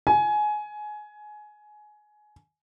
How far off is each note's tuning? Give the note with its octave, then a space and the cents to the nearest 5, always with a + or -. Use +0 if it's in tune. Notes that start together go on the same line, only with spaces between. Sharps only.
G#5 +20